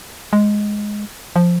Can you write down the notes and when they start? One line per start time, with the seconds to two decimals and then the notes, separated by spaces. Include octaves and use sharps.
0.33 G#3
1.36 F3